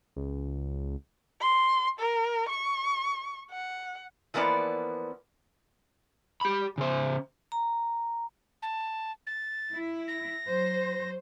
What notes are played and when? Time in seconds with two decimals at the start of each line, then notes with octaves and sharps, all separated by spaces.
0.16 C#2
1.41 C6
1.99 A#4
2.49 C#6
3.51 F#5
4.34 E3 F3 A#3 B3 D5
6.41 G4 B5
6.78 C#3 C5
7.52 A#5
8.62 A5
9.27 A6
9.74 E4
10.08 A#6
10.47 F#3 C5